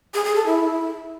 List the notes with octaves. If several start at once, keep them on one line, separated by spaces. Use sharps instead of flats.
G#4
G#4
A4
E4